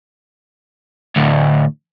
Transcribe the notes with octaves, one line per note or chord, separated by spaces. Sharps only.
D2 A2